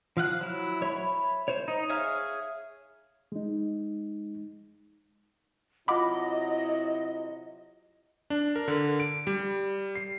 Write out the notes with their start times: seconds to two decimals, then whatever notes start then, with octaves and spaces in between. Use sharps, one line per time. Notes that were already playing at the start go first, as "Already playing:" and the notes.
0.17 F3 F5 F#5 F#6
0.41 F#3 E4
0.82 C#5 E5 B5
1.48 C5 C#5
1.68 D#4
1.90 G#4 C#5 E5 F5 F6
3.32 G#3 D#4
5.88 C3 F#3 E4 F4 D#5 F#5 B5 D6
8.30 D4
8.56 A#4
8.68 D3
9.00 D7
9.27 G3
9.96 C7